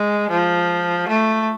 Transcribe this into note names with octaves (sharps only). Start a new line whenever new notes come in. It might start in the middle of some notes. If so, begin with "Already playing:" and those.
Already playing: G#3
F3
A3